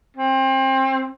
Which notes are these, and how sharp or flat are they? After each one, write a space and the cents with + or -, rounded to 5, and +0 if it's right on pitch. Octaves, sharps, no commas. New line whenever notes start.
C4 +30